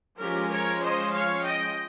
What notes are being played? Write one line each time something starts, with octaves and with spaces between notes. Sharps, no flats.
F3 G#3 C#4 G4 A#4
A#4 C#5
C5 D#5
C#5 F5
D#5 G5